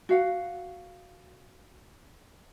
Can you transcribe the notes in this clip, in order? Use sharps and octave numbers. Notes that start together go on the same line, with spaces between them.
F#4 F5 F#5